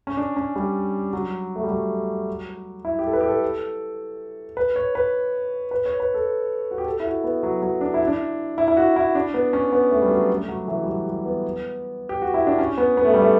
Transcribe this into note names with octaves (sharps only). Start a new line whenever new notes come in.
C#4
D4
C#4
G3
F#3
A3
G3
F#3
E4
G4
A4
B4
G4
A4
B4
C#5
B4
B4
C#5
B4
A4
F#4
G4
A4
E4
F#4
B3
F#3
F#3
D4
E4
D4
E4
E4
F#4
E4
D4
B3
C#4
B3
A3
G3
F#3
A3
F#3
E3
G3
F#3
G3
B3
G4
F#4
E4
D4
C#4
B3
B3
A3
G3
A3